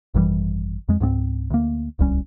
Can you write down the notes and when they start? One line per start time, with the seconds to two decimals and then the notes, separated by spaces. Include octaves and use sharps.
0.14 G#1 F#2 E3 G3
0.89 F2 G#3
1.00 C#2 G#2 B3 C4
1.50 D2 A#3
1.99 D1 C2 G3 C#4